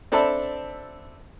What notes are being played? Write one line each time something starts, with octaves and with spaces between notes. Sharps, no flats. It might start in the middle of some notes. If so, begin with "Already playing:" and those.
C4 D4 A4 E5 A5 B5